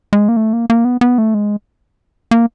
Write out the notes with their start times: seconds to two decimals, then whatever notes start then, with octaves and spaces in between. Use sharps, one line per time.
0.13 G#3
0.29 A#3
0.37 A3
0.53 A#3
0.70 A#3
0.85 B3
1.01 B3
1.18 A3
1.34 G#3
2.31 A#3